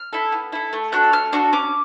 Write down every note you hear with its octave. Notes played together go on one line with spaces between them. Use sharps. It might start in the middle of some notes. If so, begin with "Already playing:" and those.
Already playing: F6
E4 A4
B3
E4 A4
A3
D4 F#4 A4 F#6
A3 F6
D4 F#4 A4 C#6
C#4 D6